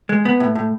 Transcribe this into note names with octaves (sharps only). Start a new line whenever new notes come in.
G#3
B3
A2
A2